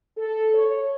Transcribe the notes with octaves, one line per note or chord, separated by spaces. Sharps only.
A4
C#5